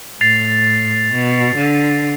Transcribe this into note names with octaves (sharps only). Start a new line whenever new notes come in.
A2 A6 C7 F7
B2
D3